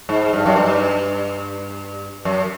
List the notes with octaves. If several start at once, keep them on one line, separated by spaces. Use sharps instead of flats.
G#2
G2
F#2
G2
F#2